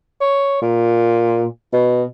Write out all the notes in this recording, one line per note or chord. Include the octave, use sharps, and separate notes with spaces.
C#5
A#2
B2